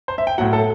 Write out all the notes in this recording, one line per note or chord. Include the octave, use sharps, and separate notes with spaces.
C5
E5
G5
A2 F#3 F#5
A4